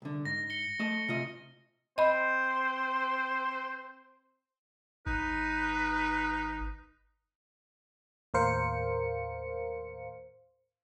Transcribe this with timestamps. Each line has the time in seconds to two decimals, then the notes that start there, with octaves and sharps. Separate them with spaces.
0.02 C2 D3
0.25 G#2 A#6
0.50 C#7 G7
0.79 A3 D#5 A5
1.08 C3 F4 D#5
1.98 C4 C5 D#5 B5
5.07 G#1 D#4 B4
8.34 D#2 A2 A#4 C5 F5 C#7